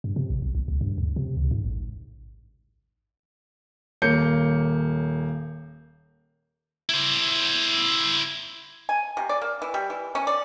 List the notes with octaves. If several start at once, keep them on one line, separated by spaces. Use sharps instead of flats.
G2
C3
A#1
B1
B1
C#2
G2
D2
C3
C#2
G#2
A1
D#1 A#3 C#5 G6 C#7
E4 C5
G#5
C3
D5
A#3
E3
G3
E3
C#4
D5